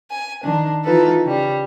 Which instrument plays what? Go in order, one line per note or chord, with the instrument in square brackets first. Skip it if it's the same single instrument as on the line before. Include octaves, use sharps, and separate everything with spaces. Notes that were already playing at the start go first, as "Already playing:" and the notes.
[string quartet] G#5
D#3 D4
E3 D#4 F4 A4 B4
C#3 G3